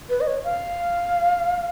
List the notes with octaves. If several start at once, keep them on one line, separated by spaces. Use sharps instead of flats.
B4
D#5
C#5
F5